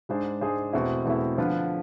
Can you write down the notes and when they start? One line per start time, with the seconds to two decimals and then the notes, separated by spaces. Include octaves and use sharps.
0.09 G#2 G#3 D4 G#4 C5
0.41 G#2 G#3 D4 G#4 C5
0.73 E2 B2 A3 C4 E4
1.05 E2 B2 A3 C4 E4
1.38 D3 F3 B3 F4 B4